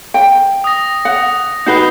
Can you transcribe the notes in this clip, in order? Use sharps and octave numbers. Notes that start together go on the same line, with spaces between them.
G5
D#6 A#6
F#5
D#4 F#4 B4 G6 C7 G7